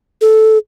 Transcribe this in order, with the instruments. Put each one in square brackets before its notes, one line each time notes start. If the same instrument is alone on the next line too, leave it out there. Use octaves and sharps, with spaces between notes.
[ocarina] A4